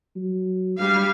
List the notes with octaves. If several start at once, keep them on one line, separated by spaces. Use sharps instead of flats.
F#3
G2 G3 F5